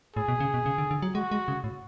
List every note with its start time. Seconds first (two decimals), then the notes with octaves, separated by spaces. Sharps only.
0.16 A2 G#4
0.28 B2
0.40 C#3
0.54 B2
0.66 C#3
0.78 D3
0.91 D3
1.02 F#3
1.15 G#3 F#4
1.31 G#3
1.48 C#3
1.64 A2